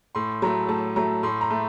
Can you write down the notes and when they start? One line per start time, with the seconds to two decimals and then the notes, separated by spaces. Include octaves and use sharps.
0.15 A2 C6
0.42 F#3 A3 A#5
0.68 A2 A5
0.96 F#3 A3 A#5
1.23 A2 C6
1.41 A#5
1.50 A3